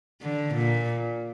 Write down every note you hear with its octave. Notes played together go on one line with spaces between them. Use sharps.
D3
A#2